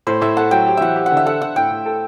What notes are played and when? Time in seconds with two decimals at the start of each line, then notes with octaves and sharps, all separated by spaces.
0.07 A2 C5
0.21 A2 E5
0.37 A4 F#5
0.51 F#3 G5
0.67 G4
0.77 E3 E5 F#5
0.96 G4
1.06 F#5
1.11 D3
1.17 E5
1.26 A4 F#5
1.41 D3 F#5
1.56 A2 G5
1.71 A2
1.86 A4